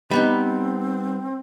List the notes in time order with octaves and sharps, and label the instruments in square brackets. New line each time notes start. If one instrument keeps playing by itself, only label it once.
[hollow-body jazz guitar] G3 B3 D#4 [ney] C4